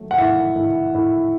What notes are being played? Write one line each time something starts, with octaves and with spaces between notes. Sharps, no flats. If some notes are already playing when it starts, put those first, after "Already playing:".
Already playing: F#3 A3
F#5
A2 E5
A2
A2